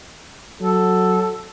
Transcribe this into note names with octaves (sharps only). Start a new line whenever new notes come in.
F#3 A4